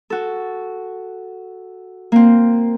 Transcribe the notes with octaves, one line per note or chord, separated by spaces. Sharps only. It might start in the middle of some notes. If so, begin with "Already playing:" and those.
F#4 A4
A#3 C4